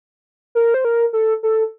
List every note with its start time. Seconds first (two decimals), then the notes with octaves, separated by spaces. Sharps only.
0.55 A#4
0.74 C5
0.85 A#4
1.13 A4
1.43 A4